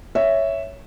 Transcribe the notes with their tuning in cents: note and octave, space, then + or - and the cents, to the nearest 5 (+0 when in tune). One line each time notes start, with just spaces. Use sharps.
C#5 +5 E5 +0